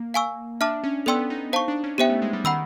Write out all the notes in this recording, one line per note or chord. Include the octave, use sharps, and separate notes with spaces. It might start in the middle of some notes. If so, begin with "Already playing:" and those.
Already playing: A#3
F5 G#5 C#6 E6
D4 E5 A5 D6 F6
C#4
B3 A4 D5 G5 C6 E6
D#4
D#4 C5 F5 A5 C#6
D4
C#4
B3 G4 C5 E5 G5
A3
G#3
G3
D#3 F#5 B5 E6